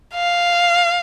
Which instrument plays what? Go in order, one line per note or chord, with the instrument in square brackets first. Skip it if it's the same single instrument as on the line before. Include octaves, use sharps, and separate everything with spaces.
[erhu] F5